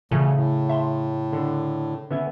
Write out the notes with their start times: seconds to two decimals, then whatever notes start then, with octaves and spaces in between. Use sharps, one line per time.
0.11 D2 A#2 C#3 E3 A3 G#5
0.33 A2
0.69 E5 A5 C6
1.33 D3
2.11 D3 B3 C#4 E5 G#5